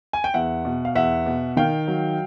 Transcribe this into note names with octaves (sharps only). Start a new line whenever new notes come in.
G#5
G5
E2 E5 F#5
B2
F5
E2 E5 F#5
B2
D#3 F5 G5
F#3